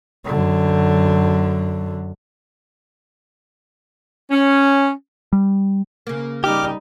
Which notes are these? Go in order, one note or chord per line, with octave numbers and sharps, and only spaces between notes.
F#2 D3
C#4
G3
C#3 A#3
G3 D#4 G4 D6 F6